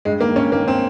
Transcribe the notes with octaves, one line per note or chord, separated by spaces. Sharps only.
G2 G#3
D#3 A#3
G2 C#4
D#3 A#3
C4